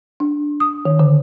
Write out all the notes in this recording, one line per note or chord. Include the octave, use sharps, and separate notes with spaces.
D4
D#6
D#3
D3